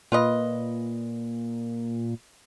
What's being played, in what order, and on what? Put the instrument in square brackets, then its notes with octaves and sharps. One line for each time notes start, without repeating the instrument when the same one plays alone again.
[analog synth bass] A#2 [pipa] F4 B4 D#5